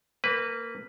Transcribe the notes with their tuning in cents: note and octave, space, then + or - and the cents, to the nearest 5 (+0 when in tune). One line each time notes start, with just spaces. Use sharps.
A#3 -20 B4 +0